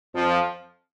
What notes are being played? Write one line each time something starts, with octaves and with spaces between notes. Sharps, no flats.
F2 F3